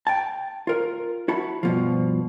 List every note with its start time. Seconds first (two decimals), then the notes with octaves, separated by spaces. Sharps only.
0.07 G5 A5
0.67 F4 A#4
1.28 E4 F#4 A5 B5
1.63 G2 B2 F3